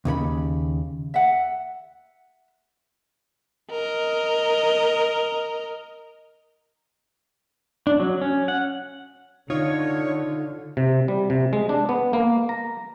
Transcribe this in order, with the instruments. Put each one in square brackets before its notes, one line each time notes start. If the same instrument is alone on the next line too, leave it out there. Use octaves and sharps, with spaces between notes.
[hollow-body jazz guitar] D#2 C#3 A4 B5
[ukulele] E5 F#5
[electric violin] A#4 D#5
[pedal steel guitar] D4
F#3
C#4
F#5
[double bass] D3 [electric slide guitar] D#4 F4 [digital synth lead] C#5
[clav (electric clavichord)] C3
G3
C3
G#3
D4
B3
A#3
A#5